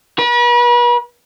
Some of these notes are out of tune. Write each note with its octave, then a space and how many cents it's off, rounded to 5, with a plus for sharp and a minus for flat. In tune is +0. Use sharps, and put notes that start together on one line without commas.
B4 -40